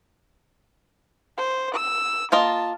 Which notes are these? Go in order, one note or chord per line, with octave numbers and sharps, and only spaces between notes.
C5
E6
A#3 F4 D#5 A5